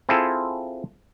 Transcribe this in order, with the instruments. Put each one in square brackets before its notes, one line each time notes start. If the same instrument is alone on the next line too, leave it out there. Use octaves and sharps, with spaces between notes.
[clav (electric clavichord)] C4 E4 F4 G#4 A4